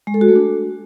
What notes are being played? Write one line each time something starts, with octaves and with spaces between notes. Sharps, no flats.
G#3
A4
F#4
A3
D4